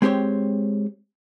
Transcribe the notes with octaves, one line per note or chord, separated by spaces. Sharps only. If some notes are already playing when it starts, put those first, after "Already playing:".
G#3 C4 G4 C5 C#5